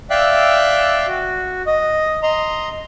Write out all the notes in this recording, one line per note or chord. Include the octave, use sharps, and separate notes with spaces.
D5 E5 F5 G5 E6 F#6
F#4
D#5
D#5 A#5 C6